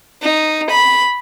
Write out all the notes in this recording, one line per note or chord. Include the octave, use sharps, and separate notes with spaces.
D#4
B5